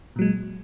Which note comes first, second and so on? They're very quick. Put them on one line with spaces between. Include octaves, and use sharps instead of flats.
A#2 F#3 G#3